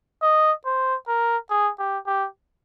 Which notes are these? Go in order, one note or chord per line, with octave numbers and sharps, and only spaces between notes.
D#5
C5
A#4
G#4
G4
G4